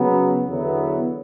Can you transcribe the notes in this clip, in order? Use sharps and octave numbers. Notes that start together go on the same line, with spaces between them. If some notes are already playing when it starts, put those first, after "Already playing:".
Already playing: C#3 F#3 B3
E2 D3 F#3 B3 E4